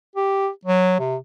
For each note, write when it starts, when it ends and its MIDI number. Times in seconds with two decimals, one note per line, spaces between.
0.16 0.49 67
0.65 0.99 54
0.99 1.16 48